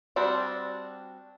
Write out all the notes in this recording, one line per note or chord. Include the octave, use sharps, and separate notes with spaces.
G3 C4 D4 F#4